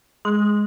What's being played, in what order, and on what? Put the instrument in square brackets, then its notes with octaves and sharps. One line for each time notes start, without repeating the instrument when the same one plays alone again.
[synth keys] G#3